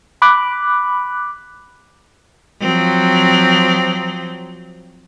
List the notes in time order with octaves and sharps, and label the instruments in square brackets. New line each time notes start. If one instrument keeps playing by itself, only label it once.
[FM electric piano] B5 D6 F#6
[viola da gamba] F3 F#3 C4